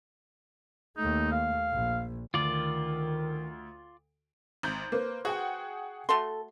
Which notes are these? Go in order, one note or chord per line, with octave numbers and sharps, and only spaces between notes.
D#2 A3 D#4
F5
A#1
D2 D#3 F4 D5
G#1 G6
A#3 B4 C5
F#4 G#4 F#5 G5
A3 F#4 A4 C6